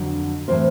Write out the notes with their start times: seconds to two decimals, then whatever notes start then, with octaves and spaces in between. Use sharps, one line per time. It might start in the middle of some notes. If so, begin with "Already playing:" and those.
Already playing: F2 D3 F#3
0.48 A2 E3 A3 C4 A#4 C5